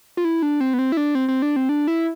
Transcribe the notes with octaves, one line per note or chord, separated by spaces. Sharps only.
F4
E4
D4
C4
B3
C4
E4
D4
C4
C4
D4
C4
D4
E4